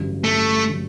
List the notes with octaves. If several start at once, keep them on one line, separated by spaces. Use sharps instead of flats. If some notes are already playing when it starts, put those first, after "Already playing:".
Already playing: A1 G2 D3 F#3
A3
D3 F#3